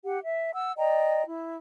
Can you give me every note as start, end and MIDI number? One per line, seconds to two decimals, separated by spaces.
0.04 0.18 67
0.04 0.18 78
0.23 0.50 76
0.53 0.72 78
0.53 0.72 88
0.77 1.22 74
0.77 1.22 75
0.77 1.22 79
0.77 1.22 82
1.27 1.56 64